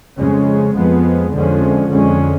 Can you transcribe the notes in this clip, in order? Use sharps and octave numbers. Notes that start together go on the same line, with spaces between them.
F2 C#3 G#3 C#4
F2 F3 G#3 B3
F2 D3 F3 G#3 C#4
F2 D3 G#3 C#4